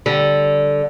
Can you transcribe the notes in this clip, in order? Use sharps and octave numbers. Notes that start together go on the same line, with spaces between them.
D3 G3